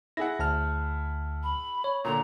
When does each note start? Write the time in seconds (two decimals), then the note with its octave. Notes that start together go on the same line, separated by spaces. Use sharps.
0.17 E4 G#4 F#5 A#6
0.39 D2 A5 F6
1.43 B5
1.84 C#5
2.04 A#2 D3 A#5